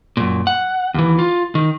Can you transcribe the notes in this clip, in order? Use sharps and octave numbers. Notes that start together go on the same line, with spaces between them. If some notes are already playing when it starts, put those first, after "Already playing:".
F#2 A#2
F#5
D#2 E3
F4
D#3